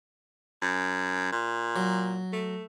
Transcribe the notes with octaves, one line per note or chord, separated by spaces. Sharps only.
F#2
A#2
F#3
A3